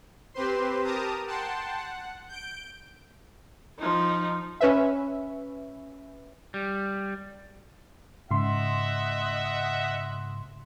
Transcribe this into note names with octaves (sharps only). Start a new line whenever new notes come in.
C4 G4 B4 C5 C6
G4 A#4 A5 A#5 D#6
F#5 G5 A5 C6
F#5
G6 D7
F3 D#4
C#4 B4 E5
G3
G#2 C#3 D#5 E5 F#5 C6